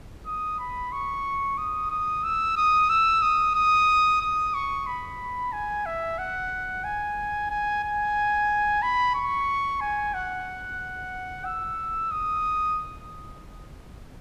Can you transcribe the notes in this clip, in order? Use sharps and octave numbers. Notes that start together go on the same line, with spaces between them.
D#6
B5
C#6
D#6
D#6
E6
D#6
E6
D#6
D#6
D#6
C#6
B5
G#5
E5
F#5
G#5
G#5
G#5
B5
C#6
G#5
F#5
E6
D#6